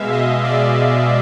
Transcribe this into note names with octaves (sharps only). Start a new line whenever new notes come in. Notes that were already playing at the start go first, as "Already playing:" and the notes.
Already playing: B2 G#3 E5 F5
D#5
D5